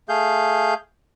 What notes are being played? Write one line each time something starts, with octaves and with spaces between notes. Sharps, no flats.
A3 G#4 F5 G6